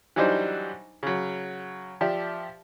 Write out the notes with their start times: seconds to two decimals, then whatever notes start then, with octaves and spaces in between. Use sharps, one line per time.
0.16 E3 F#3 G3 D4 D#4 C5
1.03 C#3 F#3
2.01 F3 G4 D5 E5